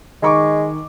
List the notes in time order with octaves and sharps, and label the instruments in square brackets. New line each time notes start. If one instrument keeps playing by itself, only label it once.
[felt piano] D#3 C#6 D6 [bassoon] G#3